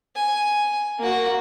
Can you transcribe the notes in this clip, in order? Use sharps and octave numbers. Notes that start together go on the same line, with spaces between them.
G#5
A#3 F#4